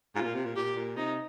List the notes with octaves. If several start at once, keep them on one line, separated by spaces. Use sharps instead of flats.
G#2 F4
C3
A#2
C3
A#2
A#2 G4
A#2
C3 D#4